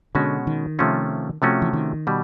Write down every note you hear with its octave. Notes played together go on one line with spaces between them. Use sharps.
B2 D3 G#3 C#4 F#4
D#3
C3 F3 A3 C#4 F4
C3 F3 A3 C#4 F#4
E3
D#3
B2 G3